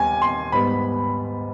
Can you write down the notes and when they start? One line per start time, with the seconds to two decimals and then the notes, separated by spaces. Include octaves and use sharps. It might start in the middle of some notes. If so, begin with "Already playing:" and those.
Already playing: D#2 G3 B3 G#5
0.22 C6
0.52 G#2 G3 B3 B5